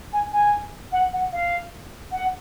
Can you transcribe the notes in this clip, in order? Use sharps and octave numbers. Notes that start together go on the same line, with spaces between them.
G#5
G#5
F#5
F#5
F5
F#5